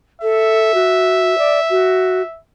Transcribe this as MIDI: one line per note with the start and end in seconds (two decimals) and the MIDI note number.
0.22 0.71 69
0.22 2.39 76
0.74 1.37 66
1.38 1.59 74
1.70 2.21 66